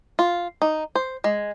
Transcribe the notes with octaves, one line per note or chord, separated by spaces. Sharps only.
F4
D#4
C5
G#3